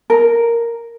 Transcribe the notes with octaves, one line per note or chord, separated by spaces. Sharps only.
A#4